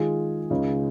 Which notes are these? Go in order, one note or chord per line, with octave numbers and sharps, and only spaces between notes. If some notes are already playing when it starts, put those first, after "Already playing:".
Already playing: D#3 G#3 F4 G#4
C#2 C#3 G#3 D#4